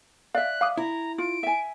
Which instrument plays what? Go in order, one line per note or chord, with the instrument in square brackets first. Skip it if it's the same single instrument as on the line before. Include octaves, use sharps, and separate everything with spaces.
[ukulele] D5 E5 [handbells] F5 [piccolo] F#6
[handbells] F5 D6 D#6
[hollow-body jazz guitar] E4 [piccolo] A#5
[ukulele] F4 [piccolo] D7
[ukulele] E5 G#5